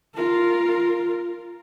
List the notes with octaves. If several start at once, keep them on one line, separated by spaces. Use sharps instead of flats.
F4 A#4